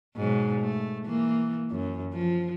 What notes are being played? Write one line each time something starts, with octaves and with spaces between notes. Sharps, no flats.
G#2 B2 F#3
A3
E3 A#3
F#2
F3